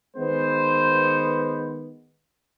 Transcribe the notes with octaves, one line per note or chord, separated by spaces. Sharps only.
D#3 G#3 B3 C5